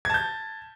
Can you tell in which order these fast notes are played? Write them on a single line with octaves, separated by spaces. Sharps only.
G#6 A5 G6